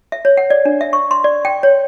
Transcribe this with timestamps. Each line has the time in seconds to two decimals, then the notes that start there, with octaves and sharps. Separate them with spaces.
0.12 E5
0.25 C#5
0.37 F#5
0.50 D5
0.65 D4
0.81 E5
0.93 C#6
1.11 C6
1.24 D5
1.45 G5
1.63 C#5